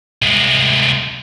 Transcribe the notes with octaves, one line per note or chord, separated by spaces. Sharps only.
C2 G#3